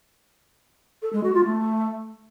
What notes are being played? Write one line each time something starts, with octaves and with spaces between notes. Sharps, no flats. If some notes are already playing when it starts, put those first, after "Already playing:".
A4
G#3
F#4
F4
A3